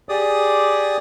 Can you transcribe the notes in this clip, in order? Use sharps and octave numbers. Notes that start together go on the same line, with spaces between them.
G4 G#4 D5 D#6